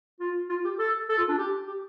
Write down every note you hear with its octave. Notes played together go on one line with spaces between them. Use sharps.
F4
F4
G4
A4
A4
F4
D4
G4
G4